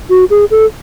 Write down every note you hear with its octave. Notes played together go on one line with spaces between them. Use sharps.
F#4
G#4
A4